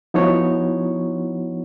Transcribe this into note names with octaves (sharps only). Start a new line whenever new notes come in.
F3 B3 D#4 E4 F#4 C#5